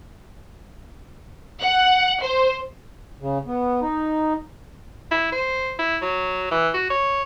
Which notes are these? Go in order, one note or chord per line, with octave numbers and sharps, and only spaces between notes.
F#5
C5
C#3
B3
D#4
E4
C5
E4
F#3
E3
F#4
C#5